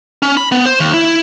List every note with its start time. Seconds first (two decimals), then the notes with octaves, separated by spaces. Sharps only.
0.22 C#4
0.37 B5
0.52 B3
0.65 C5
0.80 D#2
0.94 E4